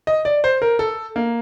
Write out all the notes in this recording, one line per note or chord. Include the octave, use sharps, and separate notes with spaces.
D#5
D5
C5
A#4
A4
A#3